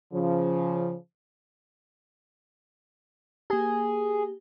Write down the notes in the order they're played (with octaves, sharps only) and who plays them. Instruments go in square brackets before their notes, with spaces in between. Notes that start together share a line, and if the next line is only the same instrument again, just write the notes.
[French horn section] C#3 F3
[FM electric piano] A#3 G4 [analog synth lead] G#4